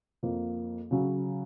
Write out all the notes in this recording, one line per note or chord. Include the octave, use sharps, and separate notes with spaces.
F2 F3 A#3
C#3 F#3 C#4 F#4